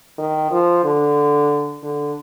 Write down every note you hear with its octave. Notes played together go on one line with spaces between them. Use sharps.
D#3
F3
D3
D3